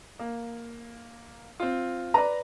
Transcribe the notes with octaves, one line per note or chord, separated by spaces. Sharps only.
A#3
C4 F4
B4 D5 A#5